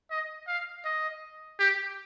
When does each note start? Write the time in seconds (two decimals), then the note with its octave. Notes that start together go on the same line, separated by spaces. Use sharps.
0.11 D#5
0.48 F5
0.85 D#5
1.59 G4